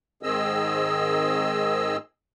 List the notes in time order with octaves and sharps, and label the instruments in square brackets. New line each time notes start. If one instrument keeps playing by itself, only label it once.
[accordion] G#2 D#3 C4 G#4 D#5 E6